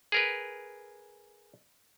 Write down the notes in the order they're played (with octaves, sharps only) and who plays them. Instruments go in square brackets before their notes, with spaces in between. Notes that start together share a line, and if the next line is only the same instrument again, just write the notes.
[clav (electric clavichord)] G#4 A#4 B4